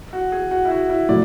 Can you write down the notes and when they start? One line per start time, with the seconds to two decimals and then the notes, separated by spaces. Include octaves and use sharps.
0.13 F#4
0.32 G#4
0.51 F#4
0.65 E4
0.71 F#4
0.90 E4
1.09 A2 F#3 D5